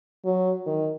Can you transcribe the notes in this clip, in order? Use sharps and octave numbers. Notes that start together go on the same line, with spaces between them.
F#3
D#3